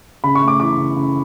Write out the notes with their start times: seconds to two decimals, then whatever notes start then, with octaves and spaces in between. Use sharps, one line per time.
0.24 C#3 B5
0.35 C#6
0.42 A3
0.48 D6
0.60 E3 D6
0.78 C#3
0.96 C#3